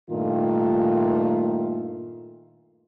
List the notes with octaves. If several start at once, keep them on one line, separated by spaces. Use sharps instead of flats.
G2 A#2 D#3 A3 F4